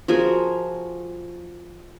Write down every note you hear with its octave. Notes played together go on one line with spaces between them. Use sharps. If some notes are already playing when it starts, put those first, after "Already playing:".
F3 F#4 G#4 A#4